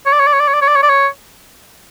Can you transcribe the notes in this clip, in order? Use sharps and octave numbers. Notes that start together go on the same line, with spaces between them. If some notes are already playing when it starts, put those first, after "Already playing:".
C#5
D5
C#5
D5
C#5
D5
C#5
D5
C#5
D5
C#5
D5
C#5